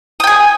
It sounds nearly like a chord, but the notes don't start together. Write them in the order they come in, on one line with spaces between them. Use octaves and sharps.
D#6 G5 G#5